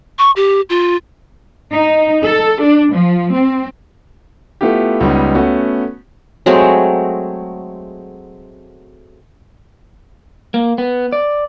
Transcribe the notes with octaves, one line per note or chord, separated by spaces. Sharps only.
C#6
G4
F4
D#4
A4
D4
F3
C4
A3 B3 E4 F4 G4
C#2 G3 B3 C#4 D#4
A3 B3 C#4 F#4
F#3 G#3 A3 C4
A#3
B3
D5